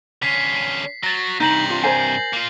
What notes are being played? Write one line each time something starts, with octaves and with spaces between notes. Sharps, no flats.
D3 C#4 B6 C7
F#3 A6 A#6
G2 C3 D#4 G6 A#6 F#7
F4
A#4 C5 G#5 C7
A#3 F4